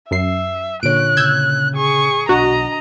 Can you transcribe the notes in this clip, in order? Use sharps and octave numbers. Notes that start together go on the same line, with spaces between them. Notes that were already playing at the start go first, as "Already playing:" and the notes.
F#2 E5 C7
A#2 D3 C#5 F#6 D7
C#3 E6 G6 G#6
G#4 C#6
B1 D4 F#4 D#5 A#5